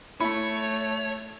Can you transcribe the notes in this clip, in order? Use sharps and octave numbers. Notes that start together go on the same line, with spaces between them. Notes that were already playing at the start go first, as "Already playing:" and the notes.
A3 E4 C#5 B5